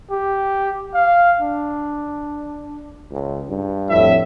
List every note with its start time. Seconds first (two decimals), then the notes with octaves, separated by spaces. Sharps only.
0.11 G4
0.94 F5
1.41 D4
3.11 C#2
3.49 G2
3.90 F2 A2 E5